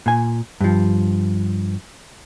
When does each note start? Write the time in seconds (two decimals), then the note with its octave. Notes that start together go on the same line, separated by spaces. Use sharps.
0.06 A#2 G#5
0.61 G2 F3